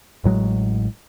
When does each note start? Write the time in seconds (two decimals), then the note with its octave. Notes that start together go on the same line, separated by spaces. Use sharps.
0.24 A1 A2 F#3 G#3